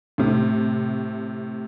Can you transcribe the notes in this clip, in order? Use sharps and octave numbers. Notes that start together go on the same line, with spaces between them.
A2 C3